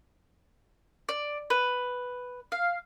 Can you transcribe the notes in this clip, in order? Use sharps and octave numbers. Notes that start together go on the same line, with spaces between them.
D5
B4
F5